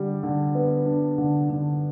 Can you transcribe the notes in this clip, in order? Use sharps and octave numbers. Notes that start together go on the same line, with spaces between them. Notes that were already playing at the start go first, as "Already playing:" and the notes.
Already playing: D3 G3
D3
B3
D4
D3
D3